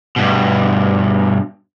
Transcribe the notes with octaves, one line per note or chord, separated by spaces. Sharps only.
G2 B2